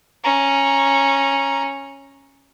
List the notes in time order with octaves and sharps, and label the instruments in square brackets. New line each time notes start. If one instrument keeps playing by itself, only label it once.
[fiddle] C#4 [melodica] A#5